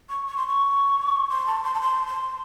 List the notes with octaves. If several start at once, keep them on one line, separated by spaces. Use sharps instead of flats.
C#6
C#6
C6
C#6
C6
A5
C6
A5
C6
C6